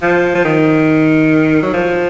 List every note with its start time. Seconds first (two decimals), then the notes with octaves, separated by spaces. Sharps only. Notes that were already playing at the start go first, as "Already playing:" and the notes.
0.02 F3
0.35 F3
0.45 D#3
1.63 F#3
1.74 F3